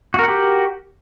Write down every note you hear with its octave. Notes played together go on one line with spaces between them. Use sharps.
F#4 G4 A#4 F#5